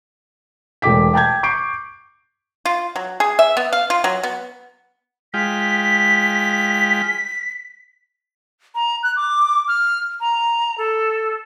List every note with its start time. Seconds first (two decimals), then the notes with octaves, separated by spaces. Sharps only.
0.82 E1 A3 G5 D6 B6
1.13 G5 A5 G6 G#6
1.43 C#6 D6 G6 C7 D7
2.65 F4
2.96 F#3
3.20 G#4
3.39 E5
3.57 B3
3.73 F5
3.90 F4
4.04 F#3
4.23 B3
5.34 G#3 F4 G5 B6
8.75 A#5
9.03 F#6
9.16 D6
9.68 F6
10.20 A#5
10.78 A4